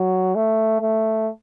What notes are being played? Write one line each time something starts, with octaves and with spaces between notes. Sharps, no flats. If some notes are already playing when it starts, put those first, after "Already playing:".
Already playing: F#3
A3
A3